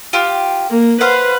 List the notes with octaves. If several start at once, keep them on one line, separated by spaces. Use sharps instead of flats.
F4 G4
A#3
B4 C5 F5 F#5